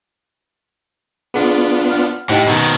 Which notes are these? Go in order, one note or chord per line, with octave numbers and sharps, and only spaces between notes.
B3 D4 F4 G#4 A4 F#5
F#5 F6
A2 D#4 G4 C5 D#5 F#5 G5
B2 D#3 A#5